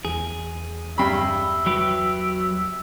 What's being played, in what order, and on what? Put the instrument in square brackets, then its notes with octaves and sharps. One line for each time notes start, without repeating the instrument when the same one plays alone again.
[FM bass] E2 [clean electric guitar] G#4
[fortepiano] G2 B5 [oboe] E5
[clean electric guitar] F#3 G4 B4